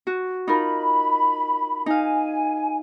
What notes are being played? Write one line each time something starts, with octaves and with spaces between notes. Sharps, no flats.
F#4
D#4 F4 A#4 B5
D#4 F5 G#5